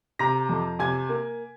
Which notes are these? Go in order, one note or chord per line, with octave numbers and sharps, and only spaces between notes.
C3 A#5 A#6
F2
C3 G#5 G#6
A#3